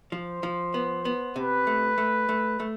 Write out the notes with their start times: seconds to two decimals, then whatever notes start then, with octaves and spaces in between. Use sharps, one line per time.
0.12 F3 C5
0.43 F3
0.74 B3
1.05 B3
1.36 C3 B4
1.67 A3
1.98 A3
2.29 A3
2.60 A3